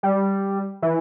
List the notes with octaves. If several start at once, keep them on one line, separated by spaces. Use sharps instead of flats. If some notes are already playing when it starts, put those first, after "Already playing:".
G3
E3